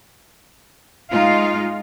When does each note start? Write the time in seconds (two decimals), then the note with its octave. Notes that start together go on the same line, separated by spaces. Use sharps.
1.11 G#3 D#4 F4 F5